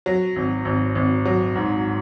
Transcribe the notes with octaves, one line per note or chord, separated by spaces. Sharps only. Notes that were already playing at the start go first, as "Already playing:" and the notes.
F#3
G#1
G#1
G#1
F#3
G#2